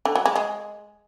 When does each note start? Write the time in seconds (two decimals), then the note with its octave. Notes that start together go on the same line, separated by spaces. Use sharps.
0.05 D3
0.15 F#3
0.26 G#3
0.36 G#3